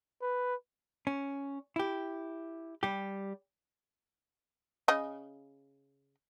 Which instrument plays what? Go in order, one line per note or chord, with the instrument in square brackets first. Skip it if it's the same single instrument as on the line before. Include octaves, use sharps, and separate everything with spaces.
[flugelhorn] B4
[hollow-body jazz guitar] C#4
E4 G4
G3 G4
[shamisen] C#3 D#5